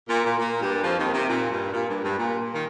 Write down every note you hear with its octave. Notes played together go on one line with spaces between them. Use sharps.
A#2
A#2
A#2 A#3
G2 G3
F2 F3
D#2 D#3
C3
A#2
G2
A#2
G2
G2
A#2
A#2
D#3